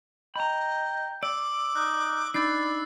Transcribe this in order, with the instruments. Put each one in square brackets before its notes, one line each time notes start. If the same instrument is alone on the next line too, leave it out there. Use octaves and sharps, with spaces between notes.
[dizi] D#5 [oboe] G5 [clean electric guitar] A#5 B5
[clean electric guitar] D5 [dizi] D6 [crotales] E6
[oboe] D#4 [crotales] F#6
[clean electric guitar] D4 D#4 [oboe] D5 [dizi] B5 [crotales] E6 A6 C7